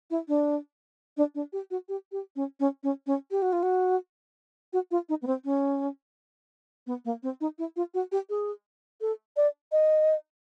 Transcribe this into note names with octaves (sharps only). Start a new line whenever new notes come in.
E4
D4
D4
D4
G4
F#4
G4
G4
C#4
C#4
C#4
C#4
G4
F#4
F4
F#4
F#4
F4
D#4
B3
C4
C#4
B3
A#3
C4
D#4
E4
F4
F#4
G4
G#4
A4
D5
D#5